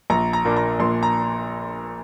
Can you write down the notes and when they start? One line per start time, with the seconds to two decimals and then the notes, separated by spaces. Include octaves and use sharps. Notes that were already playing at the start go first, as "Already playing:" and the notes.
0.10 A#1 A#5
0.33 A#5
0.45 A#2 A#3 D4
0.56 A#5
0.80 A#1 C6
1.03 A#5